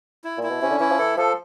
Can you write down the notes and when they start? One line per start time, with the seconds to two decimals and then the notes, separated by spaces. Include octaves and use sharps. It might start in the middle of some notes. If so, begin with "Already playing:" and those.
0.24 E4
0.38 A#2
0.43 E4
0.50 B2
0.62 C3 C#4
0.71 D3
0.80 E3 E4
0.90 F3
0.99 E3 A4
1.17 F3 A4